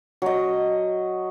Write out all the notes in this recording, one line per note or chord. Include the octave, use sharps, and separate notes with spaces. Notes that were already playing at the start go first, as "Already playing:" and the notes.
F#3 D#5